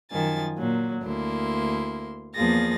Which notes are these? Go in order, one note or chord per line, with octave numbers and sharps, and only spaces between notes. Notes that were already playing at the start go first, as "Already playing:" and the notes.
F#2 D#3 F3 G#5 A6
A#2 F#3
D2 A#3 E4 C6
E2 F3 A#3 G#4 A6 A#6